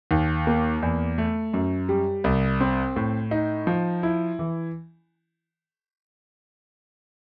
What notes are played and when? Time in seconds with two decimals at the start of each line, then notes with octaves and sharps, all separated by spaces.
0.11 D#2
0.47 A#3
0.82 E2
1.18 A3
1.54 F#2
1.89 G3
2.24 C2
2.61 C4
2.96 A2
3.31 D#4
3.67 F3
4.03 E4
4.39 E3